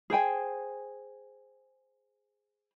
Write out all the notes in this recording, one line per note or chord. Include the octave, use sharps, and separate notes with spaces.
G#4 C5 G5 G#5